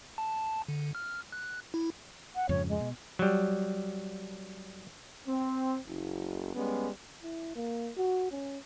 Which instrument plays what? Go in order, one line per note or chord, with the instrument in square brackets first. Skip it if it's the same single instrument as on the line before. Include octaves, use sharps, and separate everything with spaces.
[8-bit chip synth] A5
D3
F6
F#6
E4
[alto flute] F#5
[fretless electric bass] F2 G#2 C#3 [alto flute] C#5
[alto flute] G#3
[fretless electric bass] B2
[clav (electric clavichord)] F#3 G3
[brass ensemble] C4
F#1
G3 G#3 B3 C#4
[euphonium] E4
A#3
F#4
C#4